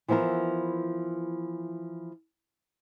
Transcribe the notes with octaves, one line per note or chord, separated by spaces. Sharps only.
E3 F3 B3 E4 A#4